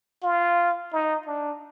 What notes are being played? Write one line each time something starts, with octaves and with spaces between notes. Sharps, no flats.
F4
D#4
D4